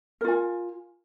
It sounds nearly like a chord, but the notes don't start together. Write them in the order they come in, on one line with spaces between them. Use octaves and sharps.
A#4 F4 G#5